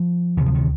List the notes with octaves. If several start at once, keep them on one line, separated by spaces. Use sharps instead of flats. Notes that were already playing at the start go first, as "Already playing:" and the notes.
Already playing: F3
D2 C3 D#3
F3
D#3